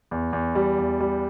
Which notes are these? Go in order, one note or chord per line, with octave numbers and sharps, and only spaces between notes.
E2
E2
G3
E2
G3